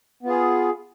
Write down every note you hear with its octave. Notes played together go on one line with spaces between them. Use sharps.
B3 F4 G#4